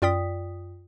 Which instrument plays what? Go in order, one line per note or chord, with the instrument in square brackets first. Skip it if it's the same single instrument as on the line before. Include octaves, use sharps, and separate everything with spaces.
[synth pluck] F#2 F4 D5 G5 D#6 B6